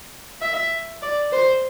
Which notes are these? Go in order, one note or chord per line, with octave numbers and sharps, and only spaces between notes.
E5
D5
C5